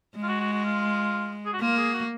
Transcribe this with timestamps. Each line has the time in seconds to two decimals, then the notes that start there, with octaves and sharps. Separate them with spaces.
0.16 G#3
0.23 F4
0.28 F#4
0.40 F#4
0.52 F#4
0.65 F4
1.45 G#4
1.53 F#4
1.60 A#3 F4
1.77 G#4
1.93 F#4